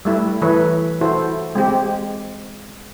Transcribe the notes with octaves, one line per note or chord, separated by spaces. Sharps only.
G3 A3 E4
E3 A4 B4 C#5
E4 F#4 A4 C5
G#3 C4 G4